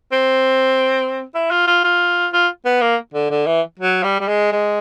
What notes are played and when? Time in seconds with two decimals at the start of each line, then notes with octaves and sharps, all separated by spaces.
0.12 C4
1.35 E4
1.51 F4
1.67 F4
1.84 F4
2.33 F4
2.65 B3
2.81 A#3
3.14 D3
3.30 D3
3.46 E3
3.79 F#3
4.03 G3
4.20 G3
4.28 G#3
4.52 G#3